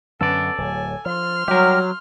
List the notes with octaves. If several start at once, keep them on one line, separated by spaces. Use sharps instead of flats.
F#2 D3 B3 C#4 A4 D5
D1 F#3 G#5
F3 C6 F6
F#3 G3 G4 A#4